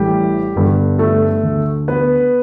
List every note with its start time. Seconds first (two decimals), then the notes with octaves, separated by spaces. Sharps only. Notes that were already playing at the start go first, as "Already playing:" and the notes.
Already playing: A1 A2 E3 G3 G4
0.55 G1 G2 D3
0.99 A3 A4
1.43 D2 D3
1.88 B3 B4